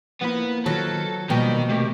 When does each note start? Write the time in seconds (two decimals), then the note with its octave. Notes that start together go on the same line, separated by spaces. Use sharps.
0.21 F3 A#3 B3 E4 B4
0.66 D#3 F#3 F4 A4
1.30 B2 D#3 F3 G3 A#3 G5
1.70 C3 A3 G4 A#4